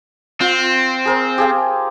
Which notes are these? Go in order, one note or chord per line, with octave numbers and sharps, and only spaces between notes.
C4 F4
G#4 A#4 C5
G4 G#4 F5